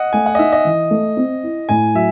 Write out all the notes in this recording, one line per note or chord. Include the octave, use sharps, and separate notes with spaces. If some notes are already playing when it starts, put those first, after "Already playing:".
Already playing: D#5 F#5
A3 G#5
F#5
D#5
D#4 E5
D#5
E3
A3
C4
E4
A2 G#5
F#3 E5